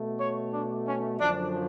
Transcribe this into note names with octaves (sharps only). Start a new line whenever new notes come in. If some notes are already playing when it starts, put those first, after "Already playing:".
Already playing: B2 A3
C#5
D4
C#4
F#2 D3 F3 D4